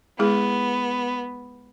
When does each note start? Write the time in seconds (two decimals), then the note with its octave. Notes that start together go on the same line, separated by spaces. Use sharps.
0.19 G#3 B3 E4 G#4